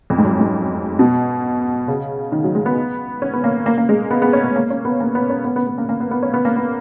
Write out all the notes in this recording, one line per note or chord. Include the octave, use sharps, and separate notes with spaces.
F2
G#2
F#2
G#2
B2
C#3
D#3
F#3
G#3
B3
C#4
B3
A#3
A#3
A#3
G#3
B3
B3
C#4
B3
A#3
C#4
B3
A#3
B3
C#4
B3
B3
B3
A#3
A#3
B3
B3
C#4
B3
A#3
B3